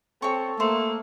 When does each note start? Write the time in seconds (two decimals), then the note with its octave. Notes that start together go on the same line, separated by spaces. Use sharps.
0.22 C4 A4 C#5 C#6
0.60 A3 A#3 C5